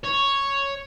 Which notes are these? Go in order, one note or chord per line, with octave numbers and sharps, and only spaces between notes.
C#5